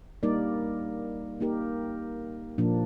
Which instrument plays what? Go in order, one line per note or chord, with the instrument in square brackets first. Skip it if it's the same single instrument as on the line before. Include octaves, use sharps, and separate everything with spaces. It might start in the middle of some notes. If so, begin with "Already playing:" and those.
[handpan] G3 A#3 D#4 A#4 D5
A#3 D#4 G4 A#4
A#2 F3 A#3 D4